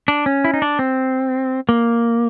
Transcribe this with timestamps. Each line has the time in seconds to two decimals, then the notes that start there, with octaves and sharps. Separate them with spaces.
0.08 D4
0.26 C#4
0.45 E4
0.54 D#4
0.62 D4
0.79 C4
1.69 A#3